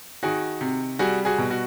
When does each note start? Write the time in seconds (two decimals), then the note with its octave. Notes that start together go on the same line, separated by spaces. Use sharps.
0.23 D#3 F#4 G#4
0.61 C3
0.99 G3 F#4 G#4
1.25 F#4 G#4
1.38 B2
1.51 F#4